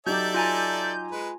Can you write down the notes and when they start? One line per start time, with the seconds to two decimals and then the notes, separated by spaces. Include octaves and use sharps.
0.06 F#3 D#4 G4 A4 D5 E5 G6
0.34 F4 G#5 A#5
1.11 G#3 B4